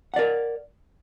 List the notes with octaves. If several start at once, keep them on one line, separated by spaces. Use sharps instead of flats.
A#4 D5 F#5